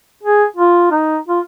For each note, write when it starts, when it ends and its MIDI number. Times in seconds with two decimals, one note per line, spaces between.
0.23 0.45 68
0.57 0.90 65
0.91 1.17 63
1.28 1.40 65